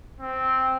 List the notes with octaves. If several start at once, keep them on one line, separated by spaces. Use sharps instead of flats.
C4